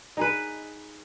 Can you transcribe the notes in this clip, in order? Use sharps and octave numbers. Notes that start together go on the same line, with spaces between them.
D#4 G#4 B4